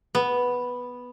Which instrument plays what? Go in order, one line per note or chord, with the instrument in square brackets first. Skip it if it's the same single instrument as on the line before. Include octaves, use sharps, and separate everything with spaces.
[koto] B3